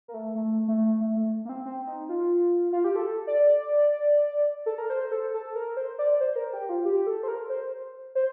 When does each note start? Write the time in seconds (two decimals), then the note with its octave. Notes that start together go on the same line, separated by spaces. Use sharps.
0.08 A#3
0.14 A3
0.35 A3
0.68 A3
1.01 A3
1.17 A3
1.45 A#3
1.49 C4
1.66 C4
1.87 D#4
2.09 F4
2.73 F4
2.84 G4
2.96 A4
3.27 D5
4.66 A4
4.78 A#4
4.90 C5
5.12 A4
5.34 A4
5.55 A#4
5.77 C5
5.99 D5
6.21 C5
6.32 C5
6.36 A#4
6.53 G4
6.69 F4
6.85 G4
7.06 A4
7.23 C5
7.28 A#4
7.50 C5
8.15 C5